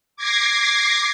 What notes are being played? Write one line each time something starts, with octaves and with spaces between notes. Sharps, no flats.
D6 G#6 A#6 C7